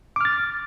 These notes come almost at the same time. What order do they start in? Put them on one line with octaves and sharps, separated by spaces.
D6 F6 A6